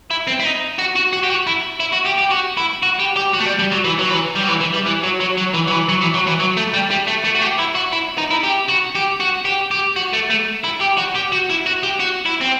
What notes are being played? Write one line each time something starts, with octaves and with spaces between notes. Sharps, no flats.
E4
C4
E4
D#4
F#4
F#4
F#4
G4
F#4
E4
E4
F#4
G4
G4
F#4
E4
F#4
G4
G4
F#4
A3
G3
G3
F#3
E3
F#3
E3
G3
F#3
E3
E3
G3
E3
F#3
F#3
F#3
E3
F#3
E3
F#3
E3
F#3
E3
F#3
A3
G3
G3
A3
A3
F#4
G4
E4
F#4
E4
D#4
E4
G4
F#4
G4
F#4
G4
G4
F#4
A3
A3
E4
G4
F#4
G4
F#4
E4
F#4
G4
F#4
E4
C4